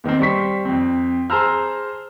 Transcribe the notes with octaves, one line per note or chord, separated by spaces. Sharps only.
E2 D#3 A#3 C4
G3 C5 C#6 B6
F2 C4
G#4 C5 A5 A#5 E6 F6